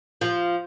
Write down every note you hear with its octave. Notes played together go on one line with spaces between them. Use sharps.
F3